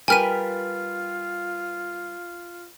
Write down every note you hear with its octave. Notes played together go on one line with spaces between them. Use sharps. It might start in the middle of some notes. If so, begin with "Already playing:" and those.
G3 F4 A#4 B4 G5 G#5 F6 D#7